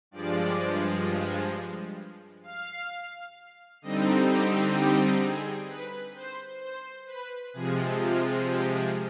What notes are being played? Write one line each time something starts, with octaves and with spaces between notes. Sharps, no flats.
G2 F3 G#3 D5
F5
D3 G3 C4 D#4 D#5
G4
G4
G#4
B4
C5
C5
B4
C3 F3 G#3 G#4
F4
G4